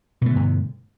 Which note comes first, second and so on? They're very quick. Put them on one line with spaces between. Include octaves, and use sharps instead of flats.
B2 A3 D3 G2